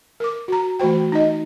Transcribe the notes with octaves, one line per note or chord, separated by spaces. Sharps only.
A#4 D6
F#4 A#5
E3 A3 F#4 C5 G5
D#4 D#5